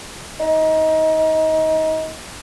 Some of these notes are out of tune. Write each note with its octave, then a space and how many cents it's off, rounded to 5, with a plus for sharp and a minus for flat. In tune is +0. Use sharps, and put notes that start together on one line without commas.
D#4 +25